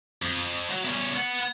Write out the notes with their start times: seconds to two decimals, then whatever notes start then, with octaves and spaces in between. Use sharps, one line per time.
0.22 F2
0.70 F#3
0.84 E2 C#4
1.15 B3 F#5